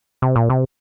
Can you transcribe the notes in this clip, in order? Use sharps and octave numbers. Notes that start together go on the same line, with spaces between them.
C3
A#2
C3